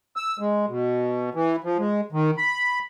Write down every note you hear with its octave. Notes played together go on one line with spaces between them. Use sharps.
E6
G#3
B2
E3
F3
G#3
D#3
B5